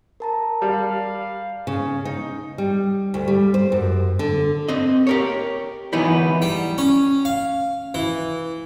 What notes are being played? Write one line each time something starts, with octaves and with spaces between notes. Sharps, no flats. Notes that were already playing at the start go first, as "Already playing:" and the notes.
A#4 A5 A#5
G3 F5
C#3
D#4
G3
D2
G3
C5
F#2
D3
C4 D#5
G4 A#4 C#5
E3 F#3 B3 D#4 E4
G3
C#4
F5
E3